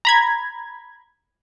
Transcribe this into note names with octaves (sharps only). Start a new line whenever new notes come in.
A#5 B5 G#6